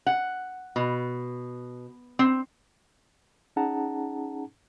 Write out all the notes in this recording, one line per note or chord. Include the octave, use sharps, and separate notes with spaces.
F#5
B2
C4
C#4 D#4 G#4 F#5 A5 A#5